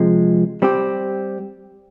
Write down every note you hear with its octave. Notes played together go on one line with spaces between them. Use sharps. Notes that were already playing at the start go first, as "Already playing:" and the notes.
Already playing: C3 F3 G#3
G3 C4 G4